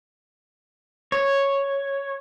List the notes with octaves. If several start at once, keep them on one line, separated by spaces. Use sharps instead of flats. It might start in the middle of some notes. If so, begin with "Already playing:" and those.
C#5